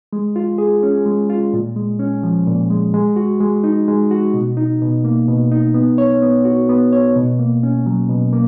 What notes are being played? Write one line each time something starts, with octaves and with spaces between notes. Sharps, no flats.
G#3
F4
G#4
C#4
G#3
F4
A#2
G#3
C#4
F3
A#2
G#3
G#3
F#4
G#3
D#4
G#3
F#4
B2
D#4
B2
A#3
B2
D#4
B3
C#5
B3
F#4
B3
C#5
B2
A#3
C#4
F#3
B2
A#3